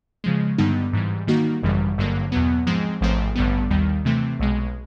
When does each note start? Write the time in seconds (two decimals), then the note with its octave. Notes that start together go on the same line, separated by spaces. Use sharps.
0.24 C#3 F3 G#3
0.58 G2 D3 G3 B3 D#4
0.93 G#2 E3 G3
1.27 D#3 G3 A#3 D#4 F#4
1.63 G#1 F#2 C#3 E3 G3
1.97 G#1 G2 D3 F#3 A#3
2.32 E2 B2 F#3 B3
2.67 G#2 F3 G#3 C4
3.01 A1 G#2 F3 A3 C4
3.36 A1 G2 D3 G3 B3
3.70 D#2 D#3 G3
4.05 C3 E3 A3 C4
4.40 B1 B2 G#3